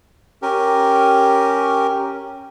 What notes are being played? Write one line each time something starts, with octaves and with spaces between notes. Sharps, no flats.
C#4 G4 A#4